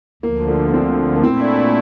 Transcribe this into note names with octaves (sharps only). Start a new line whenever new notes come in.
D2 D3 F3 A#3
A3
A#3
C4
A#3
A#2 A3 C4 E4
D4
D4